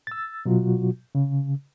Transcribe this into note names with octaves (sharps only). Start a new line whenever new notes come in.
E6 A6
B2 F#3 F4 F#4
C#3